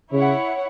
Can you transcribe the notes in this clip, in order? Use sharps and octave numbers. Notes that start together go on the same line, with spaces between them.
C#3 E4 C#5 F#5